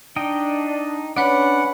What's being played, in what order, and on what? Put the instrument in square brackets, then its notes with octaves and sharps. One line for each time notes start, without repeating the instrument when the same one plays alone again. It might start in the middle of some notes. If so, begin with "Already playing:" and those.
[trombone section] D4 [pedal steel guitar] D#4 D#5 G5
[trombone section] C#4 [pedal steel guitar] D4 D5 [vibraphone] B4 C#5 B5 [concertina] F#5